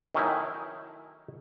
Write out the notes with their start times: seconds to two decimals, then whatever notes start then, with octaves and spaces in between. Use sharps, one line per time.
0.14 D#3 F#3 A3 C#4 D#4 E4